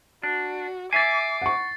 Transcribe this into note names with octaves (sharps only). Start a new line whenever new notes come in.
D4 F#4
E5 G#5 D6 A6 C7
F#5 C#6